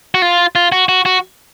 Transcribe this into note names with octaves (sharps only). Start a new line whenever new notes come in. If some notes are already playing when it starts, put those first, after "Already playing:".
F#4
F4
F4
F#4
F#4
F#4